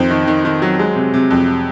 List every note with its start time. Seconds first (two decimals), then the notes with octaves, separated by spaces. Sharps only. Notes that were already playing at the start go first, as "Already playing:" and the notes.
Already playing: F2 D#3 C5
0.10 D#3
0.27 D#3
0.45 D#3
0.62 F#3
0.79 G#3
0.96 C3
1.14 C3
1.31 F2